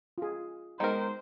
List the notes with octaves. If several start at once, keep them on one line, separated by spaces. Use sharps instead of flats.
F4 G#4
D#3 G#3 B3 D#4 A#4 C5